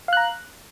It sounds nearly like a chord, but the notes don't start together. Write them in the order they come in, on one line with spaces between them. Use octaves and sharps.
F5 F#6 A#5